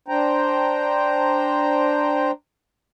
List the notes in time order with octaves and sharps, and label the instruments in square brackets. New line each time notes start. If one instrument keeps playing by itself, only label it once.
[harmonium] D4 C5 G5 A#5